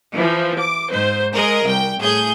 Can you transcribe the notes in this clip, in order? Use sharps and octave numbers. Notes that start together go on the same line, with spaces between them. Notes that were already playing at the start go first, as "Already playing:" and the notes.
E3 F3
D6
G#2 C5
G#3 G#4 A#4 D#5
C2 G5
A2 G#4 G6